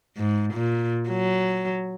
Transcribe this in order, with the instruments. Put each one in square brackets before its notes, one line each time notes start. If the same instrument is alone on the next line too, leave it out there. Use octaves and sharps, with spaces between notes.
[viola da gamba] G#2
A#2
F#3